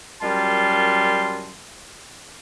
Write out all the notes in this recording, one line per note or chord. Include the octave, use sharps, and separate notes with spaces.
F#2 G3 F4 A#4 A5 C6